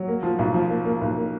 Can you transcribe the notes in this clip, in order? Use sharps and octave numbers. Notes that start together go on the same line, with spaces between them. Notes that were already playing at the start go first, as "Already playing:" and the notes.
Already playing: F#3
A#3
F3
B1
F3
A#3
A#3
B1
A#3